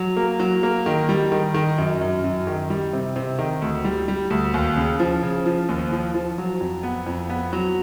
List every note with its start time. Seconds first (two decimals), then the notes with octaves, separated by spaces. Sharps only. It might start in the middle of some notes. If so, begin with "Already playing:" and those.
Already playing: F#3
0.17 A#3
0.40 F#3
0.63 A#3
0.86 D#3
1.09 G3
1.32 D#3
1.54 D#3
1.78 F#2
2.01 F#2
2.24 F#2
2.47 D#3
2.70 G3
2.93 C3
3.16 C3
3.39 D#3
3.62 D2
3.84 G3
4.08 G3
4.30 D2
4.54 D#2
4.76 C#3
5.00 F3
5.23 C#3
5.46 F3
5.69 D#2
5.92 F3
6.15 F3
6.38 F#3
6.60 F2
6.83 B3
7.06 F2
7.30 B3
7.53 F#3